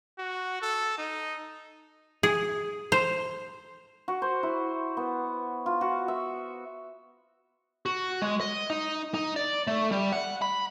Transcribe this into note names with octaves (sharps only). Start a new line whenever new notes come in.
F#4
A4
D#4
G#4
C5
F#4
C5
E4
B3
F4
F#4
E5
F#4
G#3
D#5
D#4
D#4
D5
A3
G3
F#5
B5